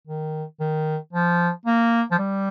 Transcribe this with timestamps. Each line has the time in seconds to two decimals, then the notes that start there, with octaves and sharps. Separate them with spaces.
0.07 D#3
0.60 D#3
1.13 F3
1.66 A#3
2.11 F3
2.18 G3